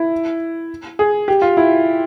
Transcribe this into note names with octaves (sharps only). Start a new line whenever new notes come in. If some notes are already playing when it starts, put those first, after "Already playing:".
Already playing: E4
G#4
G4
F4
E4